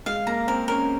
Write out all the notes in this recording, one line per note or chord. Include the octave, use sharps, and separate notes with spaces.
G#3 F5
A#3 A#5
C4 A#4
C#4 A#4